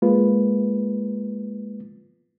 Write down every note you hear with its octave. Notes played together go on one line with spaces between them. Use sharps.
G#3 A#3 F4 B4